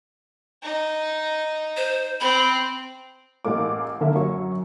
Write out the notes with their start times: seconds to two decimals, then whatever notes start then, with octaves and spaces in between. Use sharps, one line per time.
0.63 D#4
1.77 C5
2.20 C4 B5
3.45 A1 G#3 A#3 D6
4.01 D3 A#3 E5
4.16 F#2 F#3 C#6